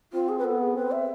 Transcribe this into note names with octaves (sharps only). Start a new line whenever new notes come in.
C4 F4
G#4
B4
B3 A4
G#4
C4 B4
E5